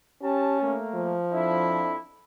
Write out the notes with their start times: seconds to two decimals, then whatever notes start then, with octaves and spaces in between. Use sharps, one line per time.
0.22 C#4 G4 G5 A5
0.61 A3 A#3
0.95 F3
1.32 F2 D4 E4